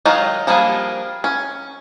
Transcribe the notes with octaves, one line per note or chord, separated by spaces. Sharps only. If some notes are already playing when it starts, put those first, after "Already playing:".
D#3 F#3 G#3 D#4 F4
F3 G3 A#3 D4 G#4
C#4